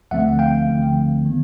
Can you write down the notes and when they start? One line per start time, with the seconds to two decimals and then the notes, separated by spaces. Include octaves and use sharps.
0.11 D2 D3 F3 A3 C4 E5 F#5
0.39 F5 G5
0.68 D2 D3 F3 A3 C4
1.25 D#3 G3 B3